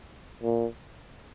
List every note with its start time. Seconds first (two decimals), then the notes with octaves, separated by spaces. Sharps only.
0.43 A#2